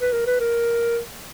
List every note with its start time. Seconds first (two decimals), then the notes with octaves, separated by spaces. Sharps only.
0.01 B4
0.12 A#4
0.27 B4
0.41 A#4